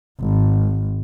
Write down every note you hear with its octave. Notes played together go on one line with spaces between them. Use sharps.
G#1